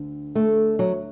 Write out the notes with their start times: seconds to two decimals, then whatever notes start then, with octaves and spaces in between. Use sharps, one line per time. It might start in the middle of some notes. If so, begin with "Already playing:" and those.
Already playing: D2 D3
0.35 A3
0.79 F#3